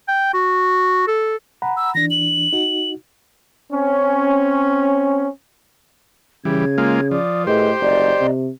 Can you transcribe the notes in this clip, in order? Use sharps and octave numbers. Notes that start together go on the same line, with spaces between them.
G5
F#4
A4
F#5 A#5 B5
E6
E3 D4 A#6
F#7
D#4 F#4
C4 C#4
C#3 E3 G3 G#6
G#3 A#3 F4
F3 D5 D6 D#6
A2 G4 G#4 B4 C5 D#5
F#1 D5 D#5 A#5
C3